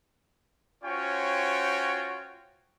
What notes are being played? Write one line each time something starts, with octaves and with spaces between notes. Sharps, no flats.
C#4 F4 F#4 C5 C#5 G5